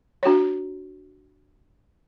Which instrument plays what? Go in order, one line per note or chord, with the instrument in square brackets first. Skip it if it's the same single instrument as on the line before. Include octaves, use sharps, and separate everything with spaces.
[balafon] D4 F#4 C#5